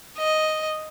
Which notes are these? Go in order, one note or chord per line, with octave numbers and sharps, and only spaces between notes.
D#5